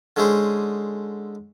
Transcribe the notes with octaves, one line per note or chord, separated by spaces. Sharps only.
D3 G#3 C#4 E4 G#4 C5